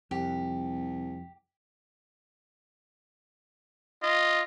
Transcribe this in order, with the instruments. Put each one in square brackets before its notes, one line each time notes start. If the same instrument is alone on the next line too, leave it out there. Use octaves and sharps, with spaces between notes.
[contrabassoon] C2 [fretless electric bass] F2 [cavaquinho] G4
[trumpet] F4 [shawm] D#5